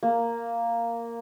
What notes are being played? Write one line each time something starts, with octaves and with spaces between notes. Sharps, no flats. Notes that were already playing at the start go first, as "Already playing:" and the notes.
A#3